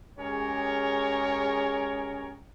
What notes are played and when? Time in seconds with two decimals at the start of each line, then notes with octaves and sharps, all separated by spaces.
0.18 G#3 C#4 G4 G#4 A#4 C#5